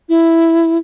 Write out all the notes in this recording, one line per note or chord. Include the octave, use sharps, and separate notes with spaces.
E4